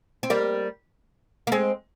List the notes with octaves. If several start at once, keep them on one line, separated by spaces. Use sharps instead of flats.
C4
G3 A#3
A#3
G#3 C4